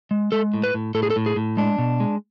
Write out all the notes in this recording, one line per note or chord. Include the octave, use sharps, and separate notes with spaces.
G#3
G#3 A4
A2
B4
A2
A2 A4
G#4
A4
A2
G#4
A2
G#3 D4
B2
G#3